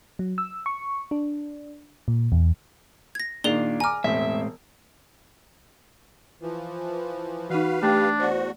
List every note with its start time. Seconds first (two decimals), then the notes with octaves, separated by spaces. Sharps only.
0.19 F#3
0.38 E6
0.66 C#6
1.11 D4
2.08 A#2
2.32 E2
3.15 G#6 A#6
3.44 A#2 D#3 D4 F4 G#4 D5 G7
3.80 G#5 A#5 D6 F6
4.04 E1 A2 G#3 C4 E5
6.42 E3 F3
7.50 E3 D#4 F#4 B4 F5
7.83 A3 D4 G4
8.20 E2 F#4 C5 D5 F#5